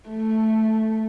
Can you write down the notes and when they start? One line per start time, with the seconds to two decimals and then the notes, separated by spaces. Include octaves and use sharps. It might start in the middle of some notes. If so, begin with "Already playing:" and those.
0.09 A3